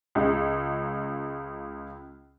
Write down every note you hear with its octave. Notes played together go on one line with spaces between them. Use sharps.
C#2 C#3